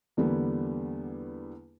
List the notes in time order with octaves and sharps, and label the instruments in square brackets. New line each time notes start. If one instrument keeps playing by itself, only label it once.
[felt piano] E2 D3 G3 A#3 B3